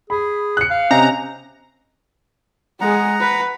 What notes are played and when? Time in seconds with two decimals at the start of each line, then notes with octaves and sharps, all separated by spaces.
0.10 G#4 B5
0.57 F#6 C#7
0.70 F5
0.91 C3 C#4 D#5 A#5
2.81 G#3 G#4 F#5 A#5
3.21 B4